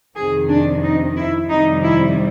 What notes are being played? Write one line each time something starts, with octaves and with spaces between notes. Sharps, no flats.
F2 C3 D#3 G#4
D4
D#4
E4
F2 C3 D#3 G3 D#4
E4